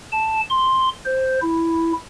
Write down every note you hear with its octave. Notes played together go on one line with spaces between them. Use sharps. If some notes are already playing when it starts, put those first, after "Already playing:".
A5
C6
C5
E4